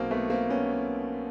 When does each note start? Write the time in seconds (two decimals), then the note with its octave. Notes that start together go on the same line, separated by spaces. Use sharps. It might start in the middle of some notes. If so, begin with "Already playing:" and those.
Already playing: B1 B2 A#3 C4
0.11 A3 B3
0.30 A#3 C4
0.50 B3 C#4